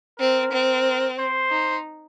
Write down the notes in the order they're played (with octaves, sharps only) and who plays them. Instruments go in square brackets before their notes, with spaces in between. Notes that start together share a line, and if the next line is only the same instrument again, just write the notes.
[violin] C4 [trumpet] A#4
[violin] C4
[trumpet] C5
[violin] D#4